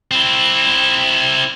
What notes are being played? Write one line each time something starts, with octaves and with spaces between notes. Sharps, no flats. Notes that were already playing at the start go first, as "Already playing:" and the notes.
C4 E4